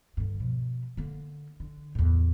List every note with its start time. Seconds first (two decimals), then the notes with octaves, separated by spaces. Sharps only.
0.17 G2 D3
0.40 B2 F3
0.97 D3 A#3
1.60 D3
1.95 E2 A2